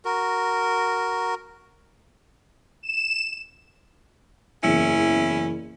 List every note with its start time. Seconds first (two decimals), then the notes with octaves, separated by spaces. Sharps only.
0.05 F#4 A#4
2.83 E7
4.63 F#1 E2 C#4 E4 C#7